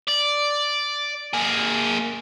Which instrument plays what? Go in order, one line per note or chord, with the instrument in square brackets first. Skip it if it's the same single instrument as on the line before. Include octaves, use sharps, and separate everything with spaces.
[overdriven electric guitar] D5
A#3 G#4